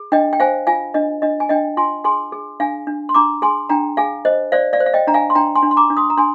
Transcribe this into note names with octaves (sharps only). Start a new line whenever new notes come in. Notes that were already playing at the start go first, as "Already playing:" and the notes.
Already playing: G#4
D4 D#5 G5
G5
C5 F5 G#5
F4 F5 G#5
D4 D#5
D4 D#5
G#5
D4 D#5 G5
F4 G#5 C6
G#4 G#5 C6
G#4
D4 F5 G#5
D4
C6
D4 A#5 D6
G#4 G#5 C6
D4 G5 A#5
G#4 F5 G#5
C5 D#5
C5 D5 F5
D5 F5
C5
F5
D#5 G5
D4 A#5
F5 G#5
C6
D4 G5 A#5
G#5 C6
D4
C6
A#5 D6
D4
C6 D#6
A#5
D4 G#5 C6